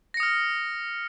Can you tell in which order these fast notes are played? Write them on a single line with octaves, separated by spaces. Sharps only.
A#6 C#7 D#6 F6